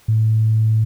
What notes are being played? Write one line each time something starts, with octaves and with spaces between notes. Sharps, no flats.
A2